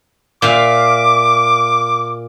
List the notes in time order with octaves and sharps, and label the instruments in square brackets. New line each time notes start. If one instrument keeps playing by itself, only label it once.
[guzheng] A#2 E5 F5 [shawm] D6